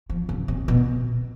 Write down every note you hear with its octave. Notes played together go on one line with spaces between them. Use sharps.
F3
C#3
C3
B2